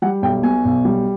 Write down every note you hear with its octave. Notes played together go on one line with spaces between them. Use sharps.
G3 F#5
B1 G5
B2 G#5
B1
G3